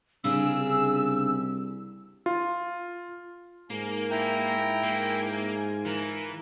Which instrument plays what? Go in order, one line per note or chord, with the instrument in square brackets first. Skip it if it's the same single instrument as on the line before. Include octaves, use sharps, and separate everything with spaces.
[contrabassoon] C2 [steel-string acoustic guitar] C#3 D4 G#4 [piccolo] E6
[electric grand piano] F4
[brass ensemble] G#2 F4 G#5 [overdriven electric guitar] A#3
[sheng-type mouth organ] E4 G5 A#5
[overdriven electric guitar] A#3
[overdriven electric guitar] E3 [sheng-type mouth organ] A#4